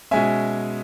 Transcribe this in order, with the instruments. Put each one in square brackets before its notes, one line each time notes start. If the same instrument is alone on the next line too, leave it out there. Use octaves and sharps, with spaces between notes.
[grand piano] B2 G#3 C#4 E5 G#5